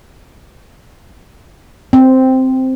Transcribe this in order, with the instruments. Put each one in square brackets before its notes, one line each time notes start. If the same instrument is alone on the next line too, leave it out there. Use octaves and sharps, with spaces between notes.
[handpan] C4